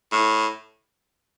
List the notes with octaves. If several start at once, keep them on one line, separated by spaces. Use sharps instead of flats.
A2